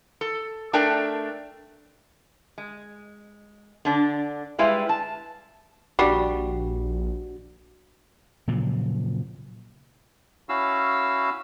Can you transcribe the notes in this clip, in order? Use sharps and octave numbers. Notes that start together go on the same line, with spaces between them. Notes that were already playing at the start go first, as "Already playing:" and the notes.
A4
A3 D4 A#4 D5 G5
G#3
D3 D4
G3 G#3 E4 B4 F5
A5
A#1 G3 D4 F#4 G4 D5 C7
A#2 C#3 F3 F#3
C#4 E4 F#4 F5 E6